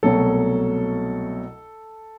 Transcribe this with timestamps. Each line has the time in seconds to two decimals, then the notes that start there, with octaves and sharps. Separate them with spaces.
0.03 C2 B2 F#3 A3 A4